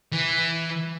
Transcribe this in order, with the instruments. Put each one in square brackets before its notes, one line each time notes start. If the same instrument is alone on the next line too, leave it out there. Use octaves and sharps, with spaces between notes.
[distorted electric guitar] E3